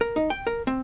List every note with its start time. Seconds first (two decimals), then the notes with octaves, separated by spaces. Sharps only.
0.01 A#4
0.16 D#4
0.30 G5
0.47 A#4
0.67 C4